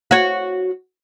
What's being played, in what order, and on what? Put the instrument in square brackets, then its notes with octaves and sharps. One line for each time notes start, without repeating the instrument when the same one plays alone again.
[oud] F#4 C#5